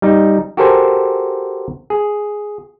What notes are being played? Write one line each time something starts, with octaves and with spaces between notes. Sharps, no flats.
G3 D#4
F#4 G4 A4 A#4 C5 G#5
G#4